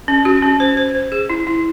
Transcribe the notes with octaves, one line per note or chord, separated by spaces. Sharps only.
C#4
F#4
C#4
C5
C5
C5
G#4
E4
E4